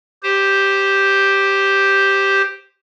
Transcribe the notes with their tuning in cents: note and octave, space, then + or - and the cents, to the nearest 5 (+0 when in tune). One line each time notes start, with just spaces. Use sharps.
G4 +0 C5 +0